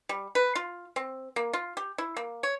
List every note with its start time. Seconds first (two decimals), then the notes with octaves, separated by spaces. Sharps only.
0.09 G3
0.35 B4
0.55 F4
0.96 C4
1.36 A#3
1.53 F4
1.77 G4
1.98 E4
2.17 A#3
2.43 C#5